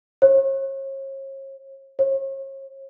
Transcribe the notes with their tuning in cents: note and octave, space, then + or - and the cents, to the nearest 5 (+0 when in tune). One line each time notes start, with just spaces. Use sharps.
C#5 -40
C#5 -40